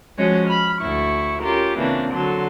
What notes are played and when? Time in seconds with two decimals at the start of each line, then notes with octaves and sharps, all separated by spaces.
0.17 F3 G#3 C#4 F#4 C#5 D#5
0.48 B5 F6
0.81 D2 E4 C#6
1.41 C#4 F4 G4 A#4
1.78 C#3 E3 A#3 C4 D4 F4
2.11 D3 F#3 A4 C6